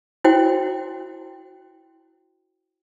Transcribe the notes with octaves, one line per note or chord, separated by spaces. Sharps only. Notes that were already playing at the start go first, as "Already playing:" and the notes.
E4 F#4 C5 G5